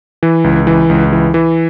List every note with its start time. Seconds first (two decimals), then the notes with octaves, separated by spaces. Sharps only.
0.23 E3
0.44 C#2
0.67 E3
0.90 C#2
1.12 E3
1.34 E3